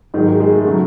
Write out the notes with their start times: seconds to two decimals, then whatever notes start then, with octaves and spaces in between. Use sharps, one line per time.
0.14 G#2 D#3 F#3 G#3
0.26 G#3
0.40 G#3
0.53 A3
0.67 C#3 F#3